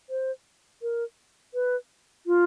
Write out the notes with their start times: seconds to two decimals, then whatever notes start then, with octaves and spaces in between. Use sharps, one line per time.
0.10 C5
0.82 A#4
1.54 B4
2.27 F4